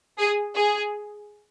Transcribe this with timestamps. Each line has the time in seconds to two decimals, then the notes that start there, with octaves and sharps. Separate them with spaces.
0.18 G#4
0.55 G#4